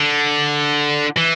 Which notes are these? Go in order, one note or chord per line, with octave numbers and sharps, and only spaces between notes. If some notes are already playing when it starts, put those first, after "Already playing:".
Already playing: D3
E3